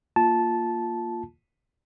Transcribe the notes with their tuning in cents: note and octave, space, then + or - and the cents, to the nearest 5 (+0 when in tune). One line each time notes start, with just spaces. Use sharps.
A#3 +0 F4 +0 A5 -10